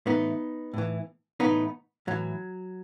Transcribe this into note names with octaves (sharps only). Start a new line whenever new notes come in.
A2 E3 B3 D#4
A2 E3
A2 E3 B3 D#4
A2 E3 F#3